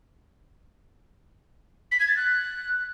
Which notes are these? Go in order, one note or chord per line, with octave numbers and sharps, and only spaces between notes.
B6
G#6
A6
F#6